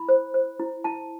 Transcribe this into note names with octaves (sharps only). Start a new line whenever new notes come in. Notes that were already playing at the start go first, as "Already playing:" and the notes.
Already playing: E4 B5
C5
C5
E4
E4 A5